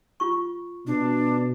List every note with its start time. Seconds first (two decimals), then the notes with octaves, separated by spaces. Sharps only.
0.20 F4 C#6
0.87 B2 D4